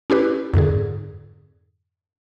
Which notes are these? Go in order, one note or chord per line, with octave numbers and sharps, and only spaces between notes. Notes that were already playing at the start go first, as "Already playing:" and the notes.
C#4 E4 G4 B4
F2 G#2 D3 G#4